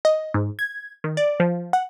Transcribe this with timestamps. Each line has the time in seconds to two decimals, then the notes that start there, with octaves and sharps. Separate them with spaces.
0.05 D#5
0.34 G#2
0.59 G#6
1.04 D#3
1.17 D5
1.40 F3
1.73 F#5